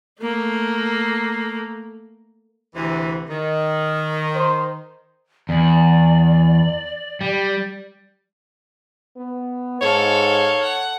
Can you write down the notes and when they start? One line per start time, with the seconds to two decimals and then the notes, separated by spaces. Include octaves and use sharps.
0.21 A3 A#3
2.75 D2 C3 E3
3.30 D#3
4.35 C5
5.49 E2 D5
7.21 G3
9.17 B3
9.81 G#2 A4 C#5 F5
10.63 F#5